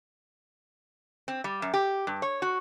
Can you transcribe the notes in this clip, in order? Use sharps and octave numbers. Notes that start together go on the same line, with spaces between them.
C4
G3
F#2
G4
G2
C#5
F#4